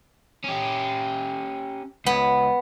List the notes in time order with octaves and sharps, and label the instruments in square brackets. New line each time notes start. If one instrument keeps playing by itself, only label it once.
[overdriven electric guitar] C#4 G4
[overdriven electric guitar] C#2 [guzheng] B3